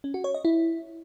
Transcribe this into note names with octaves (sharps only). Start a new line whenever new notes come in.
C#4
F#4
C#5
D#5
E4